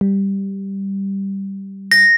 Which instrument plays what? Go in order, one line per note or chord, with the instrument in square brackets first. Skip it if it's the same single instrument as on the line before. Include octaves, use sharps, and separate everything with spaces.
[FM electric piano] G3
[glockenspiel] A#6